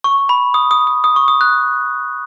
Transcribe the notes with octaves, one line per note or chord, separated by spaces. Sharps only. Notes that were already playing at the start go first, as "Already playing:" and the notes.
C#6
B5
D#6
D#6
D#6
D#6
C#6
D#6
F#6